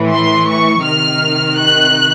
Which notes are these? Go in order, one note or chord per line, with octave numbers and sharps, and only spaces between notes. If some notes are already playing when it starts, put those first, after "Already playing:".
Already playing: A2 E3
C6
C#6
C3 D#3 F6
F#6